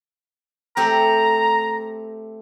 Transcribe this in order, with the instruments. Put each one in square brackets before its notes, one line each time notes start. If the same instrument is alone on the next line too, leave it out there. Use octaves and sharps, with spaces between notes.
[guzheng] A3 C4 G4 [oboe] A#5